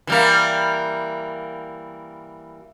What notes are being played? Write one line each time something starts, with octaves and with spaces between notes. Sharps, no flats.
E3 G3 A#3